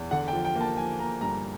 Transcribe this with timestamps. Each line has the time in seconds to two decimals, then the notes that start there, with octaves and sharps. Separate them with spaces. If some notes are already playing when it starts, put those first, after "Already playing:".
Already playing: E2
0.11 D3 F#5
0.28 G5
0.33 F3
0.45 G5
0.55 A#3
0.61 A5
0.77 F3 G#5
0.99 A#3 A#5
1.21 G2 A#5